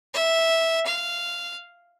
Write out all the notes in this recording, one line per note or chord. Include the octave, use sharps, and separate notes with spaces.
E5
F5